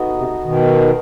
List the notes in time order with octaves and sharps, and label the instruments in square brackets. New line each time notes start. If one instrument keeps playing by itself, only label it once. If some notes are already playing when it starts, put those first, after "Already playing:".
Already playing: [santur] B3 D#4 F#4 A4
[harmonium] C3
B2 D#3